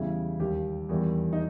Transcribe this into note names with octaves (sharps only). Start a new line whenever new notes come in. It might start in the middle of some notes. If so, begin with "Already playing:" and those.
Already playing: E2 C#3 G3 E4
D#2 D#3 G3 G4
E2 D#3 G3
D#4